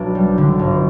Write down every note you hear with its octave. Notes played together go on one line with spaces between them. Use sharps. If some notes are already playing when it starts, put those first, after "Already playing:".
Already playing: B1 D4
G3
D3
G1